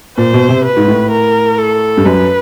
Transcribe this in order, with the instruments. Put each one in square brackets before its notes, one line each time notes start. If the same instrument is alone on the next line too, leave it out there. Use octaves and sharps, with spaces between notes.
[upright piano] A#2 [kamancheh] C5
[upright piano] B2
C3
[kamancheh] B4
[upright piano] G#2
A2
[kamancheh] A#4
A4
[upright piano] G2
[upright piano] F#2 [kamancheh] B4